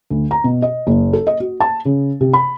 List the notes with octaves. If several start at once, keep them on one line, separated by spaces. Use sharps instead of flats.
D2
A#5
B2
D#5
F#1
A4
D#5
F#4
A5
C#3
C3
B5